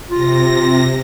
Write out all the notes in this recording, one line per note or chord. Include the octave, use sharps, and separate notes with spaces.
C3 F4 A#6